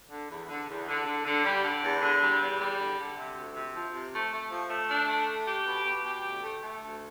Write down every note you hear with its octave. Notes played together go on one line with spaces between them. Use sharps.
D3
E2
D3
E2
D3
D3
D3
G3
D3
E2
D3
G3
E2
G3
D3
D3
C3
D2
C3
F3
C3
A3
A3
F3
A3
D4
A3
D4
G4
B2
B2
G4
D2
A3
A3
D2